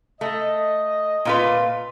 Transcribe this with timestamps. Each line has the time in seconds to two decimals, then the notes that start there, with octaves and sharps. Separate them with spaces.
0.21 A3 D#5
1.25 A#2 F4 B4